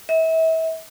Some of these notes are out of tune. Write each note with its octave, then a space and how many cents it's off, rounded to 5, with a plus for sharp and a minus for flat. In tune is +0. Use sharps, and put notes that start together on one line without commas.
E5 -35